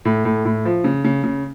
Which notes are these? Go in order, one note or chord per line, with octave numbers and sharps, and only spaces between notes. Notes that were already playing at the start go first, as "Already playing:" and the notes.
A2
A2
A2
F3
C#3
C#3
C#3